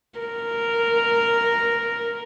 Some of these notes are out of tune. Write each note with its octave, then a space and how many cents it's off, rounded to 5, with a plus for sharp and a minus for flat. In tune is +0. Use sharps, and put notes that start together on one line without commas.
A#4 -5